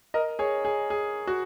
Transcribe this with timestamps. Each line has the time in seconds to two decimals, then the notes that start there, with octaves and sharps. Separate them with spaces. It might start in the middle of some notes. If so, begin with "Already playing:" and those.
0.14 A#4 D#5
0.39 G#4 C#5
0.65 G#4
0.90 G#4
1.27 F#4